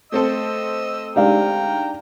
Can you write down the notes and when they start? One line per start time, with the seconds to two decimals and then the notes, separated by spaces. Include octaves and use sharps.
0.12 A3 C4 A4 D#5 E6
1.16 G#3 D4 D#4 G4 D5 F5 G5 A#5